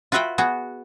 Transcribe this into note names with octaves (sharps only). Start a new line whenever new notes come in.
F4 F#4 B4 E5 F#5 G5
B3 F#4 G#4